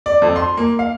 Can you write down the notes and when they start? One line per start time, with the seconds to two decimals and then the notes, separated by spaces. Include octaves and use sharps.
0.06 D5
0.22 F2
0.36 C6
0.57 A#3
0.79 F5